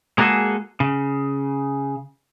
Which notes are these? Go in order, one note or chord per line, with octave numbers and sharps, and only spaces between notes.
G#3 A#3 B3 F#4 G#4 A4
C#3